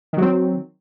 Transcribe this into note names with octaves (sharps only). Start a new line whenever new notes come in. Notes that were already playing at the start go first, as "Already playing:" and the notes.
D#3 F#3 C4